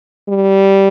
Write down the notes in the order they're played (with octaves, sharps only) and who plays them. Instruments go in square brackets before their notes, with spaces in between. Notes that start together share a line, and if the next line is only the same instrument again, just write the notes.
[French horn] G3